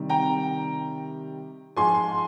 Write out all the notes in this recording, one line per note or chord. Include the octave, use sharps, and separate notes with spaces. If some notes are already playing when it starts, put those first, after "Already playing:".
Already playing: C3 D#3 G3
G5 A#5
G#2 F3 G#3 G#5 C6